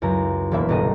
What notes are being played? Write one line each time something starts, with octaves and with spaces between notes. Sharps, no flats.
C#2 F#2 E4 A#5
E1 B2 A#3 E5 B5
G1 C2 B2 G4 D#5 A#5